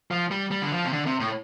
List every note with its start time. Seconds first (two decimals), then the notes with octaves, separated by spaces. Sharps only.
0.11 F3
0.31 G3
0.51 G3
0.62 D3
0.72 F3
0.85 C3
0.93 D3
1.06 C3
1.20 A2